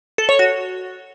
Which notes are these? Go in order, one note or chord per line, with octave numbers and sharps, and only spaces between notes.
A4
C#5
F#4